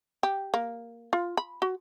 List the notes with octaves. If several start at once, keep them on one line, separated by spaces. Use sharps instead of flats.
G4
A#3
F4
B5
F#4